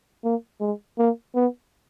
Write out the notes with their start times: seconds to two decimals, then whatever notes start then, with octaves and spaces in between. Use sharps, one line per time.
0.24 A#3
0.60 G#3
0.98 A#3
1.35 B3